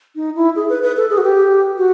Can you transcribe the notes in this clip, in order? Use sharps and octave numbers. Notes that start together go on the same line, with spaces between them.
D#4
E4
G#4
B4
B4
A4
G#4
F#4
G4
F#4